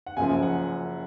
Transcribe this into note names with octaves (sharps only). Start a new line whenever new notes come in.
F#5
F#1 F#2 F3 G#5
F#5